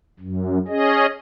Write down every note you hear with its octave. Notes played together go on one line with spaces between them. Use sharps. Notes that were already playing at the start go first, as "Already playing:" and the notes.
F#2
C#4 G#4 D#5